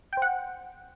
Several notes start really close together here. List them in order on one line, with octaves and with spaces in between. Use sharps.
G5 C5 F#5